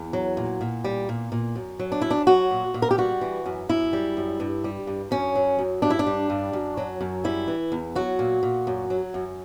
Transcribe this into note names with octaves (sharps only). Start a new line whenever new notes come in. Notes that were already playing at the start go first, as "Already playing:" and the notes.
Already playing: E2
F#3
A#2
A#2
G3
A#2
A#2
F#2
F#3
D4
F#2 E4
D4
F#3 F#4
A#2
A#2
A#4
G4
G3 F#4
E3
F#2
F#2 E4
G3
F#2
G2
G3
G2
F#2 C#4
F#3
F#2
G2 D4
E4
D4
G3
G2
F#2
F#3
F#2
G3 E4
E3
E2
F#3 F#4
A#2
A#2
F#2
F#3
F#2